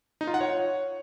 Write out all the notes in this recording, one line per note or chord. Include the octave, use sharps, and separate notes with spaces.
D#4
F4
F#5
C#5